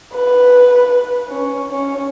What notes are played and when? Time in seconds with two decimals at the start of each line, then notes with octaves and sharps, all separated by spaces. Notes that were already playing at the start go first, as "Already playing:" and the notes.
0.14 B4
1.29 C#4
1.71 C#4